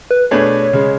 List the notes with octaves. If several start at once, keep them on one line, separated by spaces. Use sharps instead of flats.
B4
B2 A3 D4 G#4 B4 C#5
C#3 G#3